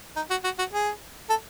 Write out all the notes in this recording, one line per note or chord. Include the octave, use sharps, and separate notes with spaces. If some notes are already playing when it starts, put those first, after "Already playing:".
D#4
F#4
F#4
F#4
G#4
A4